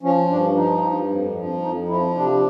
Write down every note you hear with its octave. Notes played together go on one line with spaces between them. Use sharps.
F3 C#4
G2 D4
F3 D#4
G2
F2
F3
F2 D#4
F3 E4
C3 D4